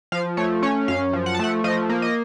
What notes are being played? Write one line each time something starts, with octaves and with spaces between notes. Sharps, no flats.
F3 F5
A3 C#5
C#4 C#5
F#2 F5
F3
F#5
A5
A3 F#5
F3 D#5
A#3
D#5